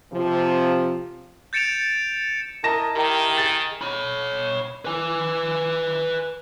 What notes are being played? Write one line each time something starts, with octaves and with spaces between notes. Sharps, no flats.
C3 F3
G6 A6 C#7 D7 E7 F7
E4 A#4 D#5 A5 A#6 E7
D#3 E4 G4 A#4
G#4 A6
C#5 B5
B4 G#5